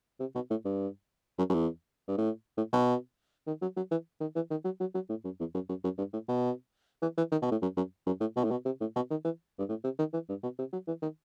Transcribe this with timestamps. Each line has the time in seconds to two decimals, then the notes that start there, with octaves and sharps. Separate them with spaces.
0.20 C3
0.35 B2
0.50 A2
0.65 G2
1.38 F#2
1.49 F#2
1.54 E2
2.08 G2
2.18 A2
2.57 A2
2.73 B2
3.47 D#3
3.62 F#3
3.76 F#3
3.91 E3
4.21 D#3
4.35 E3
4.51 D#3
4.64 F#3
4.80 F#3
4.94 F#3
5.09 A2
5.24 F#2
5.40 E2
5.54 F#2
5.69 F#2
5.84 F#2
5.98 G2
6.13 A2
6.28 B2
7.02 E3
7.17 E3
7.32 D#3
7.42 B2
7.51 A2
7.62 F#2
7.77 F#2
8.06 F#2
8.20 A2
8.36 B2
8.44 A2
8.51 B2
8.65 C3
8.81 A2
8.96 B2
9.10 D#3
9.25 E3
9.59 G2
9.69 A2
9.84 C3
9.99 D#3
10.13 E3
10.29 G2
10.43 B2
10.59 C3
10.72 F#3
10.87 E3
11.02 D#3